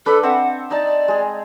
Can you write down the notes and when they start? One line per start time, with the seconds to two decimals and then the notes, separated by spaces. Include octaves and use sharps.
0.06 D4 A4 B4 B5
0.23 C4 E5 F#5
0.71 D#4 D5 A5
1.08 G#3 G#4